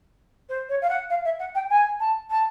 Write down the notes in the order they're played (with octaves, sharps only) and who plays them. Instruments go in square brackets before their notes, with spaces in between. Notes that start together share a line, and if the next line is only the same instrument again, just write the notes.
[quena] C5
C#5
F5
F#5
F5
E5
F#5
G5
G#5
A5
A5